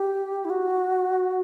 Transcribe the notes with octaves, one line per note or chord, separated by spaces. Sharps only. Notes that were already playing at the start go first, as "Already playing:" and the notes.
Already playing: G4
E4
F#4